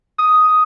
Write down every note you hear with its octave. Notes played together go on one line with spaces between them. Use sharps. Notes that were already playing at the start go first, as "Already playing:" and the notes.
D#6